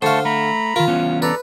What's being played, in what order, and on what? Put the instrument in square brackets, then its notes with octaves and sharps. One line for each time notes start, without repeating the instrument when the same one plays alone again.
[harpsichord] D3 F5 [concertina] A3 A5 C#6 [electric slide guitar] C5
[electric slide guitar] A3 [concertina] A#5 B5
[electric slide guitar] D#3 A#4 [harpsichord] F4
[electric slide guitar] E3 B3 C#4
[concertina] A4 D5 A#5 [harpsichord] B4